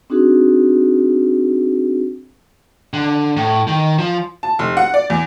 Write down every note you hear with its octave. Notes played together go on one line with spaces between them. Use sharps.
C4 D4 D#4 F#4 G#4
D3
A2
D#3
F3
A5
F1
F#5
D5
E2